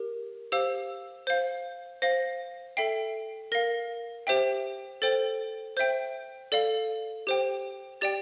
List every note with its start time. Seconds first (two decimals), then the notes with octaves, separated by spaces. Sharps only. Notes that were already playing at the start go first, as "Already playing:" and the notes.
Already playing: G4 A#4
0.52 G4 C5 F5 E6
1.27 C5 F5 G6
2.02 C5 F5 A#6
2.77 A4 E5 G5 C7
3.52 A#4 F5 A#6
4.27 G4 C5 E5 G5
5.02 A4 C5 G5 A6
5.77 C5 E5 G5 G6
6.52 A4 D5 F5
7.27 G4 C5 G5
8.01 G4 D5 G5 A6